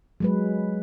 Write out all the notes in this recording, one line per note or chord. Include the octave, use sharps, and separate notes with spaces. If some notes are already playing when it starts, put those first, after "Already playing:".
F#3 G#3 B4